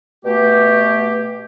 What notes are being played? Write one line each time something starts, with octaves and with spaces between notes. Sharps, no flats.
B2 A3 G4